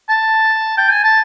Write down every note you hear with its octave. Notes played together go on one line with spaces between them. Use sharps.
A5
G5
G#5
A5